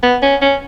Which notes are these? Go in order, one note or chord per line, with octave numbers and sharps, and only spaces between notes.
B3
C#4
C#4